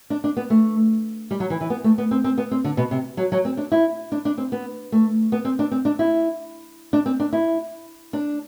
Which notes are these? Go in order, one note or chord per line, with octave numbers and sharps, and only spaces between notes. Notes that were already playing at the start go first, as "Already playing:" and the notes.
D4
D4
B3
A3
G3
F#3
E3
E3
B3
A3
B3
C4
C4
B3
C4
D3
B2
C3
F#3
F#3
C4
D4
E4
D4
D4
C4
B3
A3
B3
C4
D4
C4
D4
E4
D4
C4
D4
E4
D4